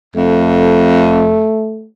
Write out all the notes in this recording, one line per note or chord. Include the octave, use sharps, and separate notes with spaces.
F2 A3